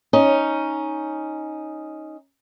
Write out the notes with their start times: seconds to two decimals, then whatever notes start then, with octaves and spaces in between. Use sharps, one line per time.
0.13 C#4 D#4